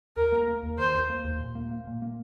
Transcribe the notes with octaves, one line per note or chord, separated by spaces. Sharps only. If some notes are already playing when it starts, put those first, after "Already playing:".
D#2 A#4
A#3
A#3
D#2
D#3 C5
D#2
A#3
D#2
A#2
A#3
A#3
A#2
A#3